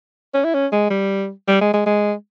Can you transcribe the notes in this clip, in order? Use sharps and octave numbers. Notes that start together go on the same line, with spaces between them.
C#4
E4
C#4
G#3
G3
G3
G#3
G#3
G#3